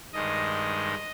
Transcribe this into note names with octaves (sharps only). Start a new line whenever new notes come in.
G2 D#3 G#3 D#5